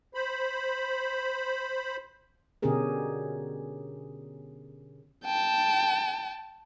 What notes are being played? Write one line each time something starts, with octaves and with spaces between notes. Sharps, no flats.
C5 B5
B2 D3 C#4 G4 G#4 A#4
G5 A5